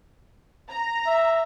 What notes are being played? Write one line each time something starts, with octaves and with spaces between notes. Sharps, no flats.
A#5
E5